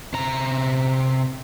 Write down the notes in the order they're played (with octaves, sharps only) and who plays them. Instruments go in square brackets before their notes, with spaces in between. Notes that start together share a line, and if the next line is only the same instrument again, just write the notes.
[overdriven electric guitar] C3 A#5